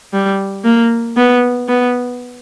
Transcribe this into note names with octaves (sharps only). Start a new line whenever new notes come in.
G3
A#3
B3
B3